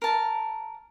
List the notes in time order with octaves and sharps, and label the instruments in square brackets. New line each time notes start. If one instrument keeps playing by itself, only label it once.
[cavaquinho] A#4 A5